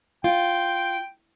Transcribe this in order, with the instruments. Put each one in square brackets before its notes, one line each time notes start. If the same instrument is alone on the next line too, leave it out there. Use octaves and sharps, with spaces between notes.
[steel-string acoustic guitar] F4 [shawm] G5